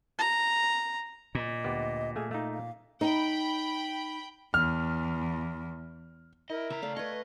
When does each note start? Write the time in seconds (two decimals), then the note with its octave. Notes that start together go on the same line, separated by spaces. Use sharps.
0.19 A#5
1.35 A#2 D#5
1.64 D2 B3 G4
2.16 A3 G#4 F5 G#5
2.31 A3 D#4 F5
2.53 F5
3.01 D#4 G5 B5
4.54 E2 F6
6.50 E4 A#4 D#5
6.70 C#3 E5 A#5
6.82 A3 D5 F5
6.96 B4 D#5 C#6 G#6